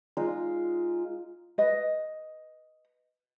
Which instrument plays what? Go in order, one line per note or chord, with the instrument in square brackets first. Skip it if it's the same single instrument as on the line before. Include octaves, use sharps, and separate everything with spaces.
[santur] G#3 D#4 F4
[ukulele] B4 D#5